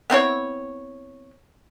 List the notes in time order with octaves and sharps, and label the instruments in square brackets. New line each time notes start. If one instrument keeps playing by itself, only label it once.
[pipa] B3 C4 E4 C#5